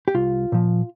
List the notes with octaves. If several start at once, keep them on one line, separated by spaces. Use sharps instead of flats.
G4
C2 F4
A#2 F3